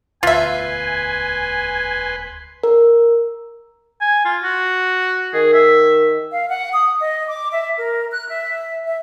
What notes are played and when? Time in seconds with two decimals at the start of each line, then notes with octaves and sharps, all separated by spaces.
0.23 E1 D2 F4 B4 E5 G#5 C6
2.64 A#4
4.01 G#5
4.25 F4
4.43 F#4
5.34 D#3 G#4
5.53 E5
6.31 F5
6.48 F#5
6.72 D#6
7.01 D#5
7.28 D6
7.52 E5
7.77 A#4
8.11 F#6
8.29 E5
8.86 E5